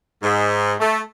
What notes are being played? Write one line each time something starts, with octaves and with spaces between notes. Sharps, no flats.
G#2
A3